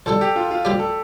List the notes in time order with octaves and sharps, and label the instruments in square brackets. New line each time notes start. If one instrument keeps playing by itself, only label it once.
[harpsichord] E2 D3 G3 [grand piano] A4
[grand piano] G4
F4
F4
[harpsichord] D2 D3 G3 D4 [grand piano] G4
[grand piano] A4